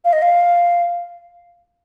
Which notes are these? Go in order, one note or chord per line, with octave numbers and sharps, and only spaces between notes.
F5
D#5
F5